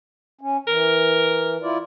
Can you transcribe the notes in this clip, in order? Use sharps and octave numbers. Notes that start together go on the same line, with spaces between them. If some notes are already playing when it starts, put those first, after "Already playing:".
C#4
E3 A#4
E4 F4 D5